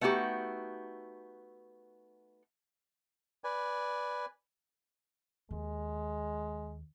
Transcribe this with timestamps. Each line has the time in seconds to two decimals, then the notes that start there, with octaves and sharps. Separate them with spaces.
0.01 A3 B3 D#4 F#4 G4
3.44 B4 D5 G#5
5.51 D#2 G#3